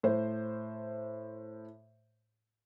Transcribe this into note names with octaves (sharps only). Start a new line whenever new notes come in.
A2 C5